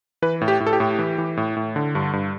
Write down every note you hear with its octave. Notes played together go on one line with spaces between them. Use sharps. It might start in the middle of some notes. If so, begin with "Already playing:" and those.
E3 B4
A2
G4
A2
A4
G4
A2
E3
E3
A2
A2
D3
G2
G2